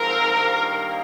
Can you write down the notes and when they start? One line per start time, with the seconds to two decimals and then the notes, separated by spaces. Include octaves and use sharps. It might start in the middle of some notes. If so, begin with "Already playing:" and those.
Already playing: G#2 F3 C4 A#4
0.30 G2 D#3 A#3